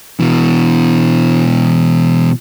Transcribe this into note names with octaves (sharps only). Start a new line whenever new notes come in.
B2 E3